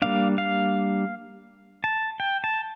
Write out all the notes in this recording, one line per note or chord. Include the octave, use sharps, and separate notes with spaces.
G3 A#3 D4 F5
F5
A5
G5
A5